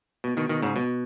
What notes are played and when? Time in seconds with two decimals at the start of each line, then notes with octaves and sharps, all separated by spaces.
0.24 B2
0.37 B2 D#3
0.49 B2 D#3
0.62 G#2 C#3
0.76 B2